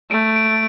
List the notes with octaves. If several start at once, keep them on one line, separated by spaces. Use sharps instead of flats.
A3 D7
D7